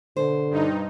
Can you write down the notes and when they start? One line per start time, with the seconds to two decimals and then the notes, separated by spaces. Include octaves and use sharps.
0.17 B2 D3 C5
0.50 G2 D#4